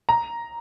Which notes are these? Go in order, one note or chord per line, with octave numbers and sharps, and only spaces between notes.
A#5